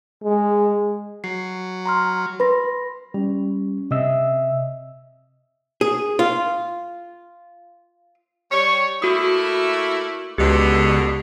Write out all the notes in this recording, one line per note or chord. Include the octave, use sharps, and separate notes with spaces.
G#3
F#3 C7
A#5 C6 F6
B4 B5 C6 A#6
G3 C#4
C3 D#5 E5 E6
G#4
F4
G3 C#5
A3 A#3 E4 F#4 D#6
C#2 B2 D3 G4